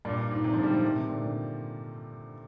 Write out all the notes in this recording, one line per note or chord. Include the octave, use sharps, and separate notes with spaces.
G2 A#2
G2
G#2
G#2 C3
D3 F3
D#3 G3
D3 F3
C3 D#3
C3 D#3
A#2 D3
A#2 D3